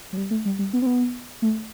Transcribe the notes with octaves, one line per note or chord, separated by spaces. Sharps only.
F#3
G3
A3
G3
G3
B3
C4
B3
A3